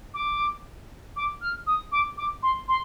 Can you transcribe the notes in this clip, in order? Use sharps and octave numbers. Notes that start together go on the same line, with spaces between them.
D6
D6
F6
D#6
D6
D6
C6
C6